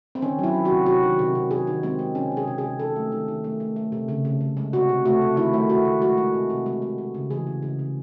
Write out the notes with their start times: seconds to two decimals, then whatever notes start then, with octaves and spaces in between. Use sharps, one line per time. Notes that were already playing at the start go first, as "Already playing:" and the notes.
0.15 C4
0.22 D#3 C#4
0.39 F#3 E4
0.55 D#3
0.65 F#4
0.71 C3
0.86 C3 F#4
1.03 D#3
1.19 C3
1.35 C3
1.51 D#3 G#4
1.67 D#3
1.83 G#3 C4
1.99 G#3
2.15 C3 C#4
2.32 C3
2.37 G#4
2.48 C3
2.58 G#4
2.64 C3
2.80 D#3 A4
2.96 A3
3.12 D#3
3.28 D#3
3.44 A3
3.60 A3
3.76 A3
3.92 C3
4.08 C#3
4.25 C#3
4.41 C#3
4.57 G#3
4.73 C3 F#4
4.89 C3
5.05 A3 F#4
5.21 C3
5.37 D#3 E4
5.54 A3
5.69 A3 F#4
5.85 D#3
6.02 G#3 F#4
6.18 G#3
6.34 C3
6.50 C3
6.66 G#3
6.82 G#3
6.98 G#3
7.14 C#3
7.31 E3 G#4
7.47 C#3
7.63 C#3
7.79 C#3